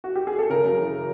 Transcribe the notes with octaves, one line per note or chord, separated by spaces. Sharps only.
F#4
G4
G#4
A4
C#3 A#4
F#2
E3